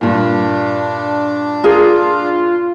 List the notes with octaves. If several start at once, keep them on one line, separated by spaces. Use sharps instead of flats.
G2 A#2 D4
F4 G#4 A#4